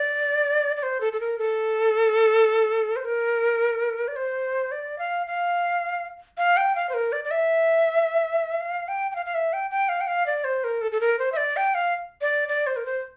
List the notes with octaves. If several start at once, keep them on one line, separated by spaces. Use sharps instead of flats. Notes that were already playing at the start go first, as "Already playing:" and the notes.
Already playing: D5
D5
C5
A4
A4
A#4
A4
C5
A#4
D5
C5
D5
F5
F5
F5
G5
F5
C5
A#4
D5
D5
E5
F5
G5
G5
F5
F5
E5
G5
G5
F5
G5
F5
D5
C5
A#4
A4
A4
A#4
C5
E5
D5
G5
F5
D5
D5
C5
A#4
C5